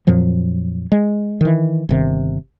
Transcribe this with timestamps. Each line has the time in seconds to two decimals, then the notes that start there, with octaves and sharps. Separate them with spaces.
0.07 F2 A#2 F3 F#3
0.92 G#3
1.41 D#3 E3
1.89 G1 C3 D#3